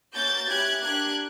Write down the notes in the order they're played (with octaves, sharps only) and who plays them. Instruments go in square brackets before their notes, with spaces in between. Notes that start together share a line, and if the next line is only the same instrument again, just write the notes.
[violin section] A#3 C#4 F#4 G6 A6
C#4 E4 G4 F#6 G#6
A#3 D4 G4 F#6 G#6